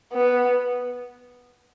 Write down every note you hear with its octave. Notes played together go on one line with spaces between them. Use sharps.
B3